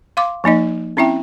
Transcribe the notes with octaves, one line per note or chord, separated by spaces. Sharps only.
F5 C6 D6
F3 A#3 D#4 D#5
C4 C#4 E4 E5 G5